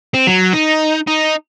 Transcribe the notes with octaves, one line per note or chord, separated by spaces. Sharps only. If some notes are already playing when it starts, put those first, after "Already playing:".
C4
F#3
D#4
D#4